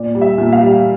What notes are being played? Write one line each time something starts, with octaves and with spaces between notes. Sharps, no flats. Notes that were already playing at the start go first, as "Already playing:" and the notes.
Already playing: A#2 D5
G3
E5
A#2
F5
G3